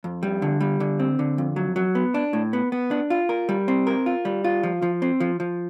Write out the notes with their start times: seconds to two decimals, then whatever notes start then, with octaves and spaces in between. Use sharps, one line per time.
0.04 F2
0.23 G3
0.42 D3
0.60 G3
0.80 D3
1.00 C4
1.19 D3
1.38 F2
1.56 F#3
1.76 F#3
1.95 B3
2.14 D4
2.33 A2
2.53 B3
2.72 B3
2.91 D4
3.10 F4
3.29 A#4
3.49 G3
3.68 C4
3.87 A#4
4.06 F4
4.25 G3
4.44 F4
4.63 F3
4.82 F3
5.02 C4
5.20 F3
5.40 F3